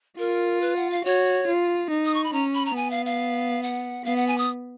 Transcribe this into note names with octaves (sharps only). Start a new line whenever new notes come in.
F4 A#4
B4
F#5
F5
F#4 C#5
F4
D#4
D#6
C#6
B5
C#4 A#5
B5
A#5
B3 G#5
F5
F5
F#5
B3 F5
F#5
G#5
D#6